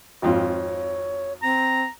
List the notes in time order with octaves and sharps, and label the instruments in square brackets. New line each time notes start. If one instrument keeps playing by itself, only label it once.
[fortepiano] G#1 F2 F4 [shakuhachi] C#5
[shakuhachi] C4 [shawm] A#5